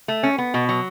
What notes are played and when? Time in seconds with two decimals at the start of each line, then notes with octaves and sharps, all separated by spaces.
0.08 A3
0.23 C#4
0.38 B3
0.54 B2
0.69 F#3